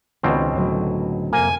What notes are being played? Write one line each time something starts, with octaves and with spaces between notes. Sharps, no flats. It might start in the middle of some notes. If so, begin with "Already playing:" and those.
C#2 B2 D#3 C4 D#4 D5
A2 D3 F#3
F2 C3 A#3 G#5